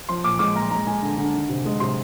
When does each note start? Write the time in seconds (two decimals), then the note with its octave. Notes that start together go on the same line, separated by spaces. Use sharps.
0.09 F3 C6
0.24 A#2 D6
0.39 G#3 D6
0.55 A#2 A#5
0.71 G#3 A#5
0.87 G#3 G#5
1.03 D3
1.17 D3
1.34 D#3
1.49 C3
1.66 G#3
1.80 C3 C6